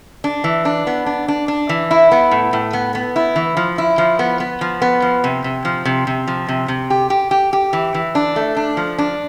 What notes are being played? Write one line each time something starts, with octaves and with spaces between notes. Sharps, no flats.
D4
E3
D4
B3
D4
D4
D4
E3
E4
B3
A2
A2
B3
B3
E4
E3
F3
E4
F3
B3
B3
F3
B3
F3
C3
C3
F3
C3
C3
F3
C3
C3
G4
G4
G4
G4
E3
E3
D4
A3
D4
F3
D4